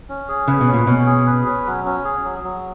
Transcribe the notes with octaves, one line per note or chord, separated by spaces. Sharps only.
C#4
G#4
C#3 B4
B2
C#4
A#2
B2 C#4
G#4
B4
C#4
F#3
C#4
G#4
F#3
F#3